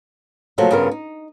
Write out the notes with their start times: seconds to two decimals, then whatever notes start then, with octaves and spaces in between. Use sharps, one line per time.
0.58 C3 F3 F#3 A3 A#3
0.71 G2 C#3 B3 F4 A#4
0.91 D#4